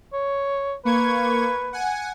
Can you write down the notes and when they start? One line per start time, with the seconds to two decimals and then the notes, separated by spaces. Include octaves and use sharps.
0.13 C#5
0.85 A#3 B4 C#6 G#6
1.73 F#5 G#5